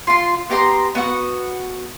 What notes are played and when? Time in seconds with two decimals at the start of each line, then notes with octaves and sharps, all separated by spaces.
0.07 F4 C6
0.50 B3 G4 A#5 C6
0.95 B3 F#4 F#5